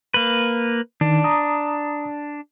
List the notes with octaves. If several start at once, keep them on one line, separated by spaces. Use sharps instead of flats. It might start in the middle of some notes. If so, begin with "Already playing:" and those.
A#3 B4
D#3 D4
A#5 D#6